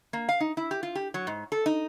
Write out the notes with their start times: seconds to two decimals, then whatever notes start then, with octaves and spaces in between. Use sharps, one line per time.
0.13 A#3
0.29 F5
0.40 D#4
0.57 E4
0.71 G4
0.83 F4
0.95 G4
1.14 F#3
1.27 G#2
1.52 A4
1.66 D#4